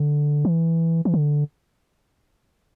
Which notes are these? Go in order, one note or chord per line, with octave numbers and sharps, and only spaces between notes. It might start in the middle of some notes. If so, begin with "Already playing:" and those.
Already playing: D3
E3
E3
D3